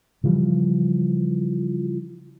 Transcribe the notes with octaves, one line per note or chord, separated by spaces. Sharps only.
C#3 E3 F3 G3